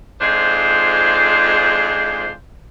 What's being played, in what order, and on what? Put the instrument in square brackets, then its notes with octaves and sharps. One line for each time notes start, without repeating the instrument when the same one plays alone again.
[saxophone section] F2 G#2 G#3 D4 F4 C5